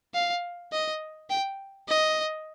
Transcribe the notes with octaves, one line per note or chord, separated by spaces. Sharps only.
F5
D#5
G5
D#5